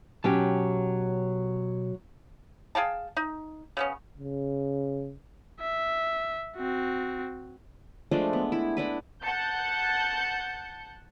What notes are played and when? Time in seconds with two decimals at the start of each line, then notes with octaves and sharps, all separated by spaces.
0.24 B2 F#3 C#4 G4 A5
2.75 G#4 F5 G5 A5
3.17 D#4
3.77 C#3 B3 C#4
4.18 C#3
5.60 E5
6.57 C4 F#4
8.11 F3 G#3 A3 D4
8.33 B3
8.52 E4
8.77 D4 E4 B4
9.23 F#5 A5 G6 C#7